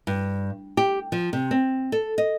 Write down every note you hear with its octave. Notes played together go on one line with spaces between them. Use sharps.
G2
G4
F3
C3
C4
A4
D#5